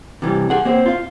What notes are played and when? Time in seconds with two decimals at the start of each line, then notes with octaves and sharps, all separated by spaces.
0.22 C3 E3 G3
0.50 G#4 F#5
0.65 A#3 C4 C5
0.86 F4 F5